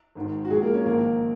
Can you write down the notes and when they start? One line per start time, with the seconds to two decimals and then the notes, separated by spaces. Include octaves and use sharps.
0.15 G#1 G#2 D#3
0.45 F#4
0.50 A#1 A#2 G#3 G#4
0.62 A#3 A#4
0.74 C#4 C#5
0.86 A#1 G#2 D#3 A#3 A#4